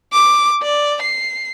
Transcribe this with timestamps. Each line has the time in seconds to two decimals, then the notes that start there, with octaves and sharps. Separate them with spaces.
0.12 D6
0.62 D5
1.02 C7